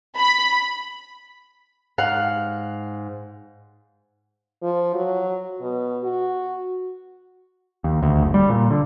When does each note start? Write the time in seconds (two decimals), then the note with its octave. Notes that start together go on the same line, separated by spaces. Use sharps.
0.18 B5
1.98 G#2 F5 F#5
4.62 F3
4.95 F#3
5.61 B2
6.03 F#4
7.84 D#2
8.03 D2
8.23 F#1
8.34 G3
8.50 A#2
8.71 D3